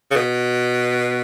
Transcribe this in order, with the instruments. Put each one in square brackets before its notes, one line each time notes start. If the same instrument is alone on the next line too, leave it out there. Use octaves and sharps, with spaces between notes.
[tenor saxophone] C#3
B2